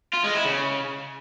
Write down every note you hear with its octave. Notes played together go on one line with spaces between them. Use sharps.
F4
G#3
E4
C#3